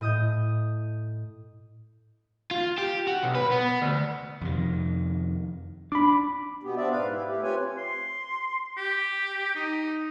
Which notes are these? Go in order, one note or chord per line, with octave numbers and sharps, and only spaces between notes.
A2 D#5 D#6 G6
F4
G4
F#4
B1
B4
B3
D2
F2 C3 D#3
D4 B5 D6
B2 B3 G4
B3 C4 D4 D5 E5
G#2 B4 F5
E4 G4
A3 G4
C4 F4 G4 B4 C#5 G#5
C6
G4
D#4